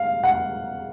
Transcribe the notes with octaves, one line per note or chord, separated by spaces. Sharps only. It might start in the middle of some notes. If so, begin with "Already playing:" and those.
Already playing: F5
F#5